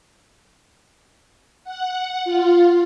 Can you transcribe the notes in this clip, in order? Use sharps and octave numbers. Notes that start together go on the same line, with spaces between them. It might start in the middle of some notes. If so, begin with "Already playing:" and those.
F#5
F4